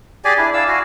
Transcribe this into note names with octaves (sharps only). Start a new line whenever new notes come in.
G4 G#4 D5 G#5
D4 E4 G#5
D5 F5 E6
F#4 F5 G#5